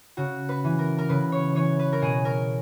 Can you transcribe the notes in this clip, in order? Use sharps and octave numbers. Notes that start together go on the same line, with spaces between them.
C#3 F#4
B4
E3
A#4
A#4
C#3 B4
C#5
E3 C#5
B4
A#4
B2 G#4
A#4